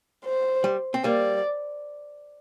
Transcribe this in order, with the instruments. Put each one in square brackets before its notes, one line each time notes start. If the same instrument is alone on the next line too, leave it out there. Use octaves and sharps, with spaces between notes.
[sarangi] C5
[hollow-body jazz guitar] G3
C4
[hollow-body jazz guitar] G3 A#3 [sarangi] D5